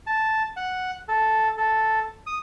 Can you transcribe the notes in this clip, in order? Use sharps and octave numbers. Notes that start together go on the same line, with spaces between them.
A5
F#5
A4
A4
D#6